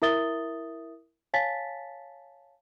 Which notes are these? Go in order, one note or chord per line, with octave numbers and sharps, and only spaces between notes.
E4 A#4 E5 D#6 A6 G7
C#5 F5 G#5 A5 A6 B6